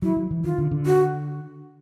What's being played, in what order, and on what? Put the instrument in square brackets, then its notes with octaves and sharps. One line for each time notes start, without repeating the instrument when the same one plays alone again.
[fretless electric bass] F#3 [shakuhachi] E4
[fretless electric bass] F#3
E3
[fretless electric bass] D#3 [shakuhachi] F4
[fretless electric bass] D3
D3
[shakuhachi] F#4